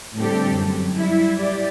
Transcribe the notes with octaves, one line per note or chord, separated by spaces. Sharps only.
A2 D3 G3 C4 G4 A4
F#2
G3 E4
G4 D5